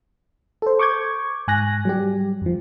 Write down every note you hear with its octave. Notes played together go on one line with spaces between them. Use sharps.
A4 C5
C#6 D6 G6 G#6
G#2 G#5 F#6 A#6
F#3 G3 G4
F2 F3